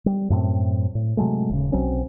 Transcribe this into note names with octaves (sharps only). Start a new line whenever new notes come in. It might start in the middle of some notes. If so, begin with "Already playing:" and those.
G3
F#2 A2 A#3 C4
A2
C3 F#3 G#3 A3
D#1 C#3
B1 F#3 C4 C#4